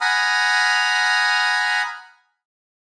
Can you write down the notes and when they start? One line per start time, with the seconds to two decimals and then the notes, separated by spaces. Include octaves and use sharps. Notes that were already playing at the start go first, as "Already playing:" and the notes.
0.01 F#5 G#5 A#5 B5 D#6 F6